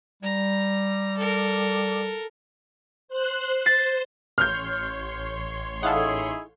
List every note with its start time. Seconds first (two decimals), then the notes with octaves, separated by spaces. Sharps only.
0.23 G3 A#5
1.17 A4 A#4
3.08 C5 F#6
3.66 C5 A6 C7
4.38 A1 C#5 C6 F6 G6
5.83 D#4 E4 G#4 A4 F5 F#5